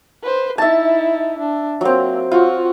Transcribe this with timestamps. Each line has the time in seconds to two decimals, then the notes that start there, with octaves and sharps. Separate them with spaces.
0.23 B4 C5
0.58 D#4 E4 E5 A5
1.39 D4
1.81 F#3 A#3 C4
2.32 F4 F#4